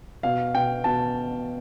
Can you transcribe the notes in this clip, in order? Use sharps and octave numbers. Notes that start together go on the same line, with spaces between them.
B2 F5
B2 G5
B2 A5